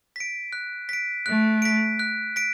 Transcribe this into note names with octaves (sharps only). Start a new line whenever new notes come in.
B6 D7
F#6
B6 D7
A3 F#6
B6 D7
F#6
B6 D7